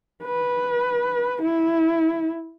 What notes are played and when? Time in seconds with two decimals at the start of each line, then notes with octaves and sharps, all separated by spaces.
0.24 B4
1.42 E4